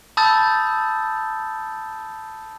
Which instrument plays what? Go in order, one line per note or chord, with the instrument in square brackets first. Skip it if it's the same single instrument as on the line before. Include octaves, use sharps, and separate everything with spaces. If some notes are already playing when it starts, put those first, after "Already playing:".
[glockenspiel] A5 B5 D#6 E6 G6 A6